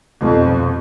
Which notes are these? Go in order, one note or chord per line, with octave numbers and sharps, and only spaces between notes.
F2 B2